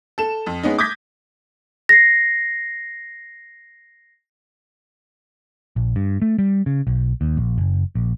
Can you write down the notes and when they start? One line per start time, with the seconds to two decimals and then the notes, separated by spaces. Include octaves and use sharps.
0.18 A4 E7
0.46 F2
0.63 G#3 B3 C#4 D#4
0.78 D6 D#6 G6 G#6 A#6 B6
1.89 A#6 C7
5.76 A#1
5.96 G2
6.22 A3
6.39 G3
6.66 C#3
6.87 B1
7.21 D#2
7.37 A#1
7.58 F#1
7.95 A#1